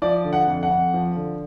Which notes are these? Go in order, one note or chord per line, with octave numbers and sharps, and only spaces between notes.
F3 D5
D3
F#5
F2
F#5
F2
F3
D3